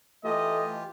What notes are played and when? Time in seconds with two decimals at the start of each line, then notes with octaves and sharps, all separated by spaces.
0.24 E3 A3 F4 G4 D#5